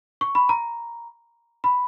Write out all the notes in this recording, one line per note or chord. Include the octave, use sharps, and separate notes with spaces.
C#6
B5
A#5
B5